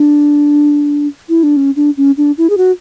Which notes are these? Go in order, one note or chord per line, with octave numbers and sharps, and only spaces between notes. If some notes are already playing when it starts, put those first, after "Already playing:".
Already playing: D4
E4
D4
C#4
D4
C#4
D4
E4
G#4
F#4